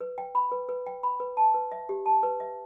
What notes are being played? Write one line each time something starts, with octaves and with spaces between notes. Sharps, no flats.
B4
G5
B5
B4
B4
G5
B5
B4
A5
B4
E5
G4
A5
B4
E5